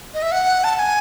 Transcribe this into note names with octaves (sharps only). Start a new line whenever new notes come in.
D#5
E5
F#5
A5
A5
G#5